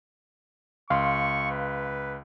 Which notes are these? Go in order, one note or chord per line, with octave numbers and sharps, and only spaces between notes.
C#2 F5 C6 C#6
B4